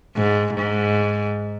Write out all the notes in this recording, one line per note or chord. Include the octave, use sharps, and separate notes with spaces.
G#2
G#2